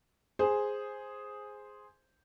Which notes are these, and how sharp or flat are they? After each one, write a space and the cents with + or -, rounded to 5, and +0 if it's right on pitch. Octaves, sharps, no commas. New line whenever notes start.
G#4 +0 C5 +0 G#5 +0